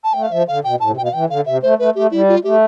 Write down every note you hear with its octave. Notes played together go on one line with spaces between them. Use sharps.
A5
A3 G5
F5
F3 E5
D3 F5
B2 G5
A2 A5
C3
B2 G5
F5
E3 G5
D3 F5
C3 E5
A3 C5
A3 B4
A3 G4
G3 E4
F4
A3 G4